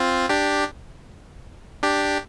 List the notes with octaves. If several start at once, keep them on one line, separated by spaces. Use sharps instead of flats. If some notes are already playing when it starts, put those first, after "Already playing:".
Already playing: C4 F4
D4 G4
D4 G4